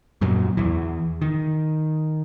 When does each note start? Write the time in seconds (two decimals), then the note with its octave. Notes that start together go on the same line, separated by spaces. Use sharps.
0.21 F#2 A#2 F#3
0.57 E2 E3
1.22 D#3